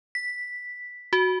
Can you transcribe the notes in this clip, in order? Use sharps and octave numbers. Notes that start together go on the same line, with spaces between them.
B6
F#4